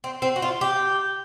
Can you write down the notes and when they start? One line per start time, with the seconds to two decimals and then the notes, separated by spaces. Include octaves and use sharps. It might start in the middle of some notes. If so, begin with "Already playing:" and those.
0.04 C4
0.22 C4
0.36 F#4
0.42 F4
0.61 G4